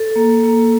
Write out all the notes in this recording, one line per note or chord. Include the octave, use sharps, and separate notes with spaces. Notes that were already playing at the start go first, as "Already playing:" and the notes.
Already playing: A4
A#3
A#3